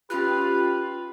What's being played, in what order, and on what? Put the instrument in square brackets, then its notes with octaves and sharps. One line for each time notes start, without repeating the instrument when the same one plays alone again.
[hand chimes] C#4 B5 F#6 [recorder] F4 [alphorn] G4 [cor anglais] B4